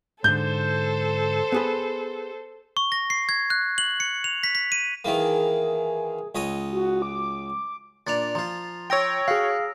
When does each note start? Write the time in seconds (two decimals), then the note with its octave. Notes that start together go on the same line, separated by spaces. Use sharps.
0.24 G#2 D3 A4 C5 G6
1.52 B3 G#4 B4
2.77 C#6
2.92 A#6
3.10 C7
3.29 G#6
3.50 F#6
3.78 F#7
4.00 C#7
4.24 F7
4.44 B6
4.55 B6
4.72 D#7
5.05 D#3 E3 A#3 G#4
6.35 C#2 C#5 D#5
6.71 F#4
7.02 D6
8.07 A#2 D4 D5 A6 F7
8.35 F3 F4 A#5
8.90 C#5 G5 E6 A#6 D7
9.28 F#4 G#4 F5